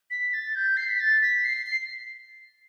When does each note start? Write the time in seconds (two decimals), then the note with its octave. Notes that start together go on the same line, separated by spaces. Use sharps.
0.10 B6
0.33 A6
0.55 G6
0.77 C7
0.89 B6
1.00 A6
1.21 B6
1.44 C7
1.66 C7